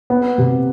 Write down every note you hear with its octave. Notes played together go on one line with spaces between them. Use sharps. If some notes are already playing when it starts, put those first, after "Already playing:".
B3
C3